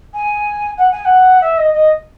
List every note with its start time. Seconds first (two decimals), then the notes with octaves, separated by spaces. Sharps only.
0.14 G#5
0.78 F#5
0.92 G#5
1.05 F#5
1.41 E5
1.58 D#5
1.73 D#5